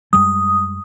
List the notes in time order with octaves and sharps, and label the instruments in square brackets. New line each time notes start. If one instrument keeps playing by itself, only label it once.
[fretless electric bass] F#2 G3 G#3 [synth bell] D#6